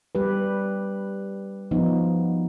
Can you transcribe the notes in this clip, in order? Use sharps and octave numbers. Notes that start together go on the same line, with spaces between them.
G3 G4 B4
F3 B3 D#4